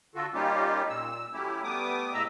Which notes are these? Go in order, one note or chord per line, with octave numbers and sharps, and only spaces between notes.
D3 F4 F#4 A4
G3 A#3 C#4 D#4 F4 G4
A#2 E6
F#3 A3 C#4 E4 G4
G3 A3 B3 D6 D#6
A2 C#3 D#5 E5 A#5 E6